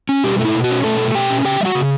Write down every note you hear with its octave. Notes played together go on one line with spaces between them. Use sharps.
C#4
B2 G3 G4
A3
E4
B2
F#4
C#4
B2 A3 A4
A3
B2 G4 G5
C#4
C#3 G4 G5
G3 F#4 E5 F#5
C#3